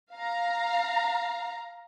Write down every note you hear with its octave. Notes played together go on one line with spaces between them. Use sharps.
F5 A#5